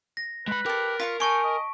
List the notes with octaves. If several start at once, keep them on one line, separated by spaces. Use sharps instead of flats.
A#6
G#3 B4 B5
G4 A4 A#4
F4 F5 C#6 B6
D#4 G#5 A5 C#6 D7
D#5